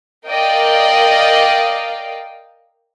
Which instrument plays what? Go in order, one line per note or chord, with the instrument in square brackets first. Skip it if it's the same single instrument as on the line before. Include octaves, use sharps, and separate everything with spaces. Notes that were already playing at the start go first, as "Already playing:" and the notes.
[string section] A#4 D5 D#5 F5 G5